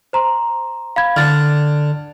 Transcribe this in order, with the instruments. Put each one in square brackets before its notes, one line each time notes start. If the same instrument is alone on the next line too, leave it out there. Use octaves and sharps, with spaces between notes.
[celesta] C5 A#5 C6
F5 B5 G#6
[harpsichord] D3 [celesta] F6 A6